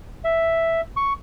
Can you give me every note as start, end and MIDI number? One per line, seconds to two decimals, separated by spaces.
0.24 0.81 76
0.97 1.13 85